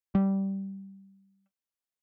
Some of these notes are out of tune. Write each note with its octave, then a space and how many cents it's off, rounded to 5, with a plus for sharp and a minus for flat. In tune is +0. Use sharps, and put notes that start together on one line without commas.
G3 -10